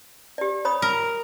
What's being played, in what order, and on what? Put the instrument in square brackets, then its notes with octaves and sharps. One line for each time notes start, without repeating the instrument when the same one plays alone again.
[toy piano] G4 D5
C#5 B5 D#6
[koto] A#4